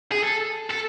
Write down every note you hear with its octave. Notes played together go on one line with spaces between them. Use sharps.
G#4
A4
A4